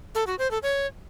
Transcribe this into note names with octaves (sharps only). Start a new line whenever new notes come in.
A4
F#4
C5
A4
C#5